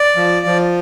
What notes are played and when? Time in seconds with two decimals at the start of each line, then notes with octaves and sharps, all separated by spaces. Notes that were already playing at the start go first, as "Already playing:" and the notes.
Already playing: D5
0.16 F3
0.46 F3